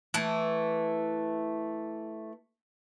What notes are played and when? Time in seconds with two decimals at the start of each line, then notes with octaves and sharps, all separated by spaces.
0.14 E3 A3